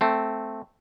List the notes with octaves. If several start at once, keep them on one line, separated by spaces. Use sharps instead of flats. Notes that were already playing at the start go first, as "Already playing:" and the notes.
A3 C4